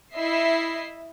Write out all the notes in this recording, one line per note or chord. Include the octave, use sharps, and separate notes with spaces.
E4 D#5 E5 C7